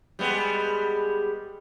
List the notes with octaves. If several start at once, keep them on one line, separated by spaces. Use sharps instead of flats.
G3 G#3 B3